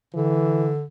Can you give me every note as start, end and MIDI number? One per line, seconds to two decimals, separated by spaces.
0.14 0.85 50
0.14 0.72 52